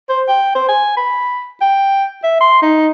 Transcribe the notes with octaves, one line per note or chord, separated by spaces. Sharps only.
C5
G5
C5
G#5
B5
G5
E5
C6
D#4